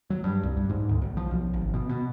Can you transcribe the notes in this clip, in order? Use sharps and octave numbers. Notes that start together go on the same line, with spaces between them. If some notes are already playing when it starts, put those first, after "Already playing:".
F#3
G2
C2
G2
G#2
D2
B1
F3
B1
G#1
B2
B2